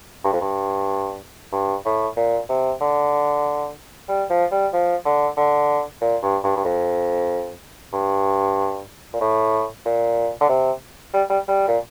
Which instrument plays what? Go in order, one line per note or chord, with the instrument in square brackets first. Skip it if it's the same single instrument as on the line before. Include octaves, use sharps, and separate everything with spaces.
[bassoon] G2
F2
G2
G2
A2
A#2
C3
D3
G3
F3
G3
F3
D3
D3
A#2
G2
G2
G2
F2
G2
A#2
A2
A#2
D3
C3
G3
G3
G3
A#2